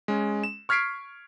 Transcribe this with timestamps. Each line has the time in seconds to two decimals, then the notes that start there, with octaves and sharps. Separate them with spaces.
0.08 G#3 C#4
0.43 E7
0.69 C#6 F6 G#6 B6 C7 D7